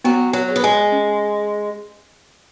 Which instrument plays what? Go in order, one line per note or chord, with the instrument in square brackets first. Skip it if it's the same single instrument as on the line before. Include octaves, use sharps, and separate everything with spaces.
[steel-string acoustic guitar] F#3 [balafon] B3
[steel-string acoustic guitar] F#3
[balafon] G#4 C#5
[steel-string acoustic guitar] B3
G#3
[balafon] C#4